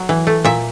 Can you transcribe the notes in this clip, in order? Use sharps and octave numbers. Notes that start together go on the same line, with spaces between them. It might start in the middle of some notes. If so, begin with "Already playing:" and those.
Already playing: F#3
E3
A3
A#2 E5